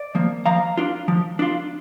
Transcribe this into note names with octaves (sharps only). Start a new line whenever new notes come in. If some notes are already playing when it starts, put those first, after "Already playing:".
Already playing: D5
F3 A#3
F3 F5 A#5
D4 F4
F3
D4 F4